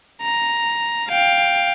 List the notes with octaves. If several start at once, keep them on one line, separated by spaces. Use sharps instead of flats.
A#5
F5 G5